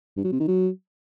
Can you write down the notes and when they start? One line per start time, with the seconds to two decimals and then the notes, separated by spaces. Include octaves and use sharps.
0.17 G2
0.25 F#3
0.32 C3
0.40 D#3
0.48 F#3